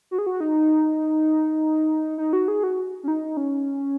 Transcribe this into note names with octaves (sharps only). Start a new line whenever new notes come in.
F#4
G#4
F#4
D#4
D#4
F#4
G#4
F#4
C#4
D#4
C#4